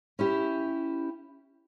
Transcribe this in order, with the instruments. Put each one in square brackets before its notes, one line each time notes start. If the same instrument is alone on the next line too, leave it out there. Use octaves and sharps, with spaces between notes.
[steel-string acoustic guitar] C#4 E4 G4